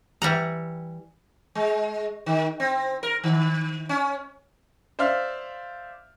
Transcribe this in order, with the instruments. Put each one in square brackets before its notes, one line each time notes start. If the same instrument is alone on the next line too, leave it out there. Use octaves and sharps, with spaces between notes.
[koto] E3 G3 F#5 A#5
[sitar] G#3
D#3
C4
A#4
D#3
C#4
[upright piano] C5 D5 E5 F5 F6